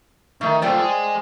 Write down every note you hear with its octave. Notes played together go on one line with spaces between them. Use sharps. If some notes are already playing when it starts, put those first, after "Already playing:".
D#3 A3
A3 F4 C5 D5 G5
G#4 D#5